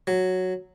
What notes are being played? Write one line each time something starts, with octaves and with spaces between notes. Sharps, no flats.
F#3